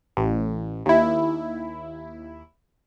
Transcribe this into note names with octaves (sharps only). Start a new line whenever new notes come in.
A1
D#2 E4